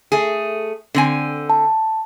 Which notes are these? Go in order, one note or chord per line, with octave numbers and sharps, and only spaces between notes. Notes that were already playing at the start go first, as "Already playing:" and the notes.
A3 G#4
D3 C4 G#5
A5